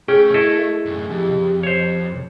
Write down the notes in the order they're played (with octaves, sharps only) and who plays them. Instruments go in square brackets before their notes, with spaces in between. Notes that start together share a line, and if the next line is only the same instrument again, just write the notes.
[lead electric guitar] A3 [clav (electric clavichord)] C#4 G5 [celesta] G#4
[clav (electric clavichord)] E4 A4 D#5
[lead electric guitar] F#2 A2
[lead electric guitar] F2 [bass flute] G4
[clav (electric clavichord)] C5 C#5